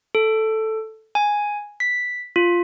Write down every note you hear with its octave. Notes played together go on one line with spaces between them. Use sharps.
A4
G#5
B6
F4